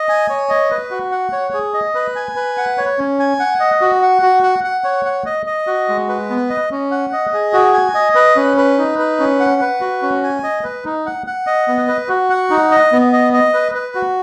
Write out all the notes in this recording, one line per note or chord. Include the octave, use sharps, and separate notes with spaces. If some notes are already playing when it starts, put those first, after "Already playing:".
Already playing: D#5
G#5
C#5
D#5
B4
F#4
F#5
C#5
G#4
D#5
B4
G#5
B4
F#5
C#5
C#4
G#5
F#5
D#5
F#4
F#5
F#4
F#5
F#5
C#5
F#5
D#5
D#5
F#4
G#3
B4
B3
D#5
C#4
F#5
D#5
G#4
F#4
G#5
D#5
B4
C#4
B4
D#4
B4
C#4
F#5
B4
F#4
C#4
G#5
D#5
B4
D#4
F#5
F#5
D#5
B3
B4
F#4
F#5
D#4
D#5
B3
D#5
D#5
B4
B4
F#4